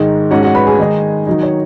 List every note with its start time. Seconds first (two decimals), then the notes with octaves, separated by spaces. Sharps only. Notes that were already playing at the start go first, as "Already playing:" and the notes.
Already playing: G#2 D#3 G#3 D#4
0.31 G#2 G#3 C#4 F#4 F#5
0.43 F#4 F#5
0.55 B4 B5
0.67 G#4 G#5
0.79 D#3 G#3 D#4
1.27 D#3 F#3 D#4
1.43 C#5